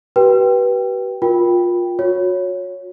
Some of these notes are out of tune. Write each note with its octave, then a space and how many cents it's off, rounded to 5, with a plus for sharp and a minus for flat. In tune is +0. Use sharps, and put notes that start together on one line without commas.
G4 -45 B4 -20 G5 +0
F4 +20 A#4 +30 G5 +0
F#4 -35 C#5 +0